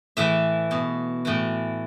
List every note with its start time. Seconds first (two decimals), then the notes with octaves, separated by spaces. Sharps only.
0.17 A2 E3 E5
0.71 B2
1.25 A2 E3